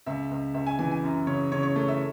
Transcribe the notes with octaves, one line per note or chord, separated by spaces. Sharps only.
C#2 E5
C#2
C#2 E5
G#5
E3 G#5
G#5
F#2
C#3 C#5
C#3 C#5
C#5
A3 C#5
E5